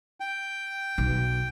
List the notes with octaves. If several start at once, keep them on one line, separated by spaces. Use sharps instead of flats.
G5
B1